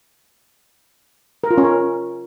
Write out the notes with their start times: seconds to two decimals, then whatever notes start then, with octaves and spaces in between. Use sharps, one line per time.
1.44 A#4
1.51 F4
1.58 C#4
1.65 A#4